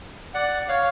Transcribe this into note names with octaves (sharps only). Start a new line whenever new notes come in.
D5 F#5
C#5 F5